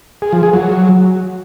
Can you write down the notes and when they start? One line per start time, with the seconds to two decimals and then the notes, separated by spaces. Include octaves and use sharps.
0.22 G#4
0.33 F3
0.43 G#4
0.53 F#3